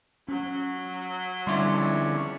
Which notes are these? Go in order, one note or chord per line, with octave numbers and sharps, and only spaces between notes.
F#3 C#4
F2 D3 G3 C#4 E4 C6